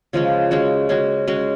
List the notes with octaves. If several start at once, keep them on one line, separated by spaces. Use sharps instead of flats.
C#3 F3 G#3 C#4
G#3 C#4 F#4
G#3 C#4 F#4
G#3 C#4 F#4